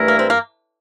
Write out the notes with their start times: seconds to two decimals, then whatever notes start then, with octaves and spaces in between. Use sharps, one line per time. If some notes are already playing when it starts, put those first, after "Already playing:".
Already playing: G2 E3 A3 E4 A#4
0.08 A#3
0.19 C4
0.30 A#3